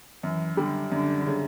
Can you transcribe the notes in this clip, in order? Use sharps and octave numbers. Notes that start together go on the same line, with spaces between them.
F#2 E3
D3 G3
F#2 D3
C#3